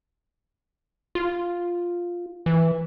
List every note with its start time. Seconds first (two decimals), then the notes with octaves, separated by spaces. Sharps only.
1.15 F4
2.46 E3